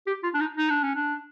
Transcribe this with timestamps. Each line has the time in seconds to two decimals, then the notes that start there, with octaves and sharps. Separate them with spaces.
0.07 G4
0.23 F4
0.34 D4
0.40 D#4
0.57 D#4
0.70 D4
0.83 C#4
0.95 D4